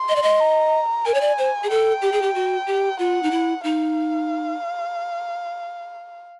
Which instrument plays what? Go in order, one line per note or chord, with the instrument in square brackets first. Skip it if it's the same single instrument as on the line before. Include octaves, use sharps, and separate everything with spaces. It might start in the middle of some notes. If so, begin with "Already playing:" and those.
Already playing: [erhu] C6
[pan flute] D#5
D5
D#5
[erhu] A#5
[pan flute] A#4 [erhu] G#5
[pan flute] C#5
D5
C5
G#4
[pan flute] A4 [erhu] G5
[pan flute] G4
G#4
G4
F#4
G4
[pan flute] F4 [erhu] F#5
[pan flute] D#4
E4
[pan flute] D#4 [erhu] F5